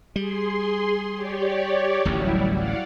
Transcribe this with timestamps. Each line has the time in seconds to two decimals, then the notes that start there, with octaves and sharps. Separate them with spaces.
0.16 G3 G#4 C6
1.15 G4 C#5 D5
2.05 D1 A1 D#2 F#3 G3 E4
2.52 D5 F5 F#5